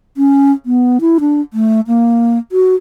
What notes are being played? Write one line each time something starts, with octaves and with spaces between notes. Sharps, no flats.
C#4
B3
E4
D4
A3
A#3
F#4